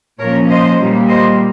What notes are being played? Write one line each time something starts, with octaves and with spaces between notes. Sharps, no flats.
A#2 F3 A#3 C#4 A#4 C#5
C5 D#5
A#2 G3 A#3
C5 D#5